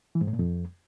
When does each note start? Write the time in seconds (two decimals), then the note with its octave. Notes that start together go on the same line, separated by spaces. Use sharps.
0.15 E3
0.21 G#2
0.27 A2
0.33 A#2
0.39 F2